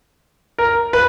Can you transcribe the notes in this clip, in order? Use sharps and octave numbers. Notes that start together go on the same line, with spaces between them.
A#4
B4